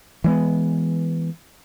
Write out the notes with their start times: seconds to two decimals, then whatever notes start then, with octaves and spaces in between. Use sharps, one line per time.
0.24 E3 G#3 B3